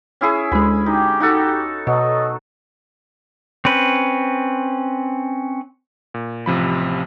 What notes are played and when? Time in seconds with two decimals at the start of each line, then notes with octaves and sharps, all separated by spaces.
0.21 C#4 E4 G#4
0.52 D2 G#3 B5
0.86 D#4 G4
1.20 D#4 F#4 A4
1.87 B2 F#3 A4 D#5 C#6
3.65 C4 C#4 B4
6.14 A#2
6.46 A1 C3 F3 B5